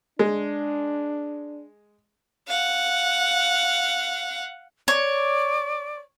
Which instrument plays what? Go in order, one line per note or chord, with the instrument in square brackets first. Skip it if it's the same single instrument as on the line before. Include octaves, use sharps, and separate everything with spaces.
[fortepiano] G#3 [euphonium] D4
[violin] F5 F#5
[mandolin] C#5 [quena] D5